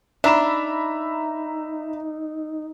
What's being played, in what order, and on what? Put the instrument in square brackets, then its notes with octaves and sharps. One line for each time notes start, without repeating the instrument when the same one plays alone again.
[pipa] D4 [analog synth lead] D#4 [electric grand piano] E5 A#5 E7 [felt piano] B5 E6